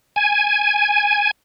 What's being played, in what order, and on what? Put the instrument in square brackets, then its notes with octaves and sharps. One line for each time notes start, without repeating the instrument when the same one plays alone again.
[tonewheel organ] G#5